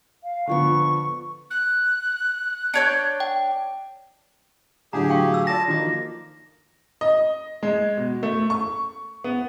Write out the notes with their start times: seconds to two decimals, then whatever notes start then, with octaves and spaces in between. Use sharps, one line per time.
0.24 F5
0.47 D3 F3 B3 C#6
1.50 F#6
2.74 D4 C#5 G6 C#7
3.20 G5
4.93 A2 D3 F#3 D4 G4 G#4 F#5 A#5
5.09 F5 G5 C#6
5.32 D#6 E6
5.47 F4 A4 D5 A5 A#6
5.68 D#3 F3 A#3 D#4 F#4 D6
7.01 D#5
7.63 G#3
7.97 B2
8.23 A3
8.50 C#6
9.24 B3